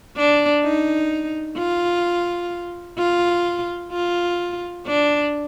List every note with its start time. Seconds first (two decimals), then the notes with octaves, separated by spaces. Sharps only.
0.17 D4
0.64 D#4
1.58 F4
2.98 F4
3.93 F4
4.87 D4